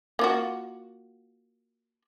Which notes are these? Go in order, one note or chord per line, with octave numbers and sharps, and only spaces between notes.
A#3 F4 F#4